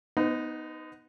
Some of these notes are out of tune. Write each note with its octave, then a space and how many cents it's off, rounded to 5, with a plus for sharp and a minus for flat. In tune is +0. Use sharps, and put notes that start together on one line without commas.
B3 +0 D#4 +0 C5 -45